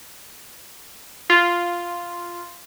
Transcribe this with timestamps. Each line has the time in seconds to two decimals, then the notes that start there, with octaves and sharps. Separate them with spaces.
1.30 F4